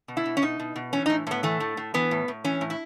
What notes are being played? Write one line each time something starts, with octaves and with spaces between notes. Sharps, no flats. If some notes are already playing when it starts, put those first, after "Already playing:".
B2
E4
B2
C#4
B2 D#4
B2
B2
E3 C#4
D#4
A2
A2 B3
E3 A3
A2
A2
E3 B3
A2
A2
E3 C#4
A2
E4